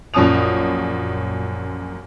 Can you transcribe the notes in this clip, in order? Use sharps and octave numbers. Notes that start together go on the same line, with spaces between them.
A#1 F#2 C#4 A5 D#6 F7